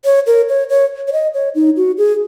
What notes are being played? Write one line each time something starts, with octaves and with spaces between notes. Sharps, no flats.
C#5
A#4
C#5
C#5
C#5
D#5
C#5
D#4
F#4
G#4